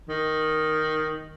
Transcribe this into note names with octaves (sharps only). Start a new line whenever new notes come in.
D#3